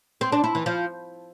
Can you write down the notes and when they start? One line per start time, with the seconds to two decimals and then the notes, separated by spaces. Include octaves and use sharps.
0.21 C4
0.32 D4
0.44 E4
0.55 E3
0.66 F3